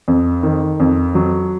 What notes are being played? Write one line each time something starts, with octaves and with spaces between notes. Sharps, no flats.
F2
D#3
F2
F#3